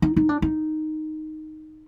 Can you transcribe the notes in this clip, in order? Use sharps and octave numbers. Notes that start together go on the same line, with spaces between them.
D#4
D#4
D4
D#4